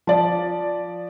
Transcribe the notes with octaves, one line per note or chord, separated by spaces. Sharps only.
F3 D5